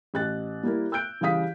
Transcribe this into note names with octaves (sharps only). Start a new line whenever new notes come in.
A1 F#6 A6
G3 A#3 E4 A#4
E6 F#6 G6 D7
C#3 E3 G3 F5 D#6 B6